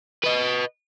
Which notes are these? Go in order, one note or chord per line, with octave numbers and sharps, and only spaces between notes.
B4 D#5